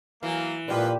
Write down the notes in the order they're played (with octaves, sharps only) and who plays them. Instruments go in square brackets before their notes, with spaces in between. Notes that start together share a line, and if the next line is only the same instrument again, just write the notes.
[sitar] E3 [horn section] F#3 A#3
[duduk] A#2 [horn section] F3 G#3 B4 [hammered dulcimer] G4 D5